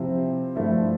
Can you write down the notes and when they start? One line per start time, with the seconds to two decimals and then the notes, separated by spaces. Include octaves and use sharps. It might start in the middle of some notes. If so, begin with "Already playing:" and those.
Already playing: C3 F3 C4 E4
0.55 G2 F3 A3 E4